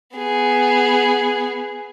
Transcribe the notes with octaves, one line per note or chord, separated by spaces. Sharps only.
B3 G#4